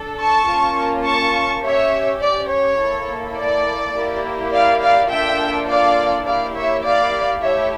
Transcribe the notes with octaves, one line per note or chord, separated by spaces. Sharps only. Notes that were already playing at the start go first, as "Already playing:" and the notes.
Already playing: D4 A4
A5 C#6
A#3 C#4 F4
A5 C#6
C#4 G4 C#5 E5
D5
C#5
A#3 E4 A4
D5
A#3 E4 G4
D5 F5
D5 F5
A#3 D4 F4 A4 E5 G5
D5 F5
A#3 E4 G4 D5 F5
C#5 E5
D5 F5
A3 E4 G4 C#5 E5